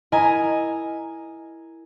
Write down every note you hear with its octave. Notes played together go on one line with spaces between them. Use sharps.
E4 A#4 D#5 G#5 A#5